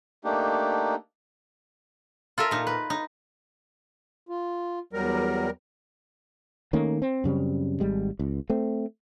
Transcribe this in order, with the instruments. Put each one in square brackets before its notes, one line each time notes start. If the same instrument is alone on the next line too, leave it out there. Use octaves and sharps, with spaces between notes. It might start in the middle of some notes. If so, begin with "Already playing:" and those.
[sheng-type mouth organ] A3 A#3 D4 D#4 G4
[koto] F4 A4 A#4 E5
A#2 D#4
B4
D#4
[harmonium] F4
[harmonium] E2 F#3 [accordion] G3 A#4
[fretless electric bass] D#3 A3 A#3 C#4
C4
F#2 C#3 G3 C4
G#1 G3 G#3
C#2
A3 C4